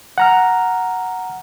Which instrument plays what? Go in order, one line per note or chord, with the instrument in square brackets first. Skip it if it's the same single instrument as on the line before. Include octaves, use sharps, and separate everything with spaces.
[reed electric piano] F#5 A#5 F6